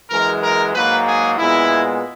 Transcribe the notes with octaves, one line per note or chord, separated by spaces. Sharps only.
F#2 E3 G#3 A#4
A#4
G#2 F#3 A#3 B4
G#4
A#2 G#3 B3 E4